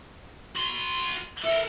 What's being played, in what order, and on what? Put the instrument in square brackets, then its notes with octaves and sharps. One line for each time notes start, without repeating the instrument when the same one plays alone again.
[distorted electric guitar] F#4 C6
[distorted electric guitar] A4 A#4 [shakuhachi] E5